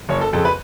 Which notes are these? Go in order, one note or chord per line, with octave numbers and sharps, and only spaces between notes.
F#1 C#5
A4
F2 C#3 A4
B4